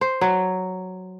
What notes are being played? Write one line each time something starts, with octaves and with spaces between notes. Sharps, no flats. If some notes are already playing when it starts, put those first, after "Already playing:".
C5
F#3